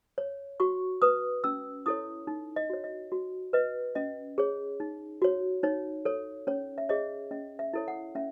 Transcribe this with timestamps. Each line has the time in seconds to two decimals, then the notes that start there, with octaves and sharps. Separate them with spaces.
0.18 C#5
0.60 F#4 C#6
1.02 B4 D#6
1.44 C#4 E6
1.86 E4 A4 C#5 D#6
2.27 D#4
2.56 D#5
2.70 F#4 C#5
2.84 D#5
3.12 F#4
3.53 B4 D#5
3.95 C#4 D#5
4.38 G#4 C#5
4.80 D#4
5.22 F#4 C#5
5.63 D#4 C#5
6.05 A4 C#5
6.47 C#4 C#5
6.78 E5
6.89 G#4 C#5 D#5
7.31 C#4 D#5
7.59 E5
7.73 E4 A4 C#5
7.88 F#5
8.15 C#4 E5